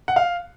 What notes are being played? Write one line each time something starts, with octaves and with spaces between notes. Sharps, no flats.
F#5
F5